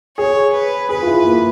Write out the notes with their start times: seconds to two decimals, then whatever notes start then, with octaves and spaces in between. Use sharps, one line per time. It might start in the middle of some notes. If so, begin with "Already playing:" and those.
0.17 G#4 C#5
0.53 B4
0.89 G#4 B4
1.02 F4
1.07 E4
1.25 A#3